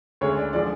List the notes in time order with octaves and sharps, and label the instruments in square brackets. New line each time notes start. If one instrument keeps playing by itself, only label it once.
[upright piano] D2 C#3 G#3 C#5
D5
D3 F3 G#3 D5